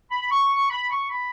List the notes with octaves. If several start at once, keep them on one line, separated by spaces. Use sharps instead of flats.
B5
C#6
B5
C#6
B5